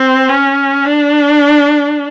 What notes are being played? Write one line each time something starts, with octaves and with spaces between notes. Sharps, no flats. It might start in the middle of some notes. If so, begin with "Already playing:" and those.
Already playing: C4
C#4
D4